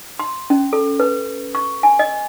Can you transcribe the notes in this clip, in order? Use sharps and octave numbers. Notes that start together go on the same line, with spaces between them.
C6
C#4
A4
B4
C#6
G#5
D#5